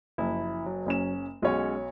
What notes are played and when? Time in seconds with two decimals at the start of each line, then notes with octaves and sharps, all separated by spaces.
0.18 F#1 F3 E4
0.66 F#3
0.86 F#1 C#4 E7
1.42 B1 G#3 C#4 F#4 C#5